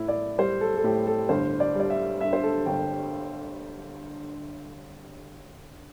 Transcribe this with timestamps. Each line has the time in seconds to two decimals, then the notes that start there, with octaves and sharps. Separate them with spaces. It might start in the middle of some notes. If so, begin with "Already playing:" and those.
Already playing: A2 E4
0.08 D5
0.38 G3 C5
0.61 A4
0.77 A4
0.84 A2 G4
1.07 A4
1.29 G1 C5
1.60 D5
1.75 G3 D5
1.90 E5
2.20 G2 E5
2.33 C5
2.44 A4
2.66 G1 G5